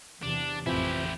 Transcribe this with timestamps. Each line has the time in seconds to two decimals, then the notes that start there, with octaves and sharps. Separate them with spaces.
0.22 E2 C3 E3 D4
0.66 A1 F2 C3 E3 F3 E4 G4